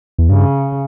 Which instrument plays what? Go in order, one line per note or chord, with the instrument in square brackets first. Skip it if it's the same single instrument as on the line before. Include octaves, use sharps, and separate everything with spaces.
[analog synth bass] E2
[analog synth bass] G2 [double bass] C#3